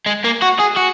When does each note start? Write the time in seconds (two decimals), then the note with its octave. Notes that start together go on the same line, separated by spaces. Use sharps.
0.06 G#3
0.24 A#3
0.42 F#4
0.59 G#4
0.76 F#4